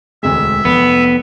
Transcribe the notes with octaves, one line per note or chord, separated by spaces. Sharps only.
E1 D2 G#3 E5
F1 B3